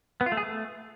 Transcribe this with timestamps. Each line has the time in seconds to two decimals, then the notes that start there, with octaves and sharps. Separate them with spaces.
0.21 B3
0.26 F4
0.32 A3
0.37 G#4
0.43 A3